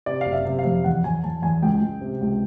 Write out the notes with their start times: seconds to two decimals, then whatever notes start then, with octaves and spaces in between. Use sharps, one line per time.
0.06 C3 D5
0.21 F#1 F5
0.33 E5
0.45 C3
0.59 F5
0.65 F2
0.84 E2 F#5
1.04 E2 G#5
1.24 E2 A5
1.42 E2 G#5
1.62 C#2 G5
1.82 C#2
2.01 C3
2.21 C#2